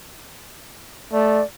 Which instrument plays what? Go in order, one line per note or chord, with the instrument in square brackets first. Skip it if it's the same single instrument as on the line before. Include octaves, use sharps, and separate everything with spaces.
[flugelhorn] A3 [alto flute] D5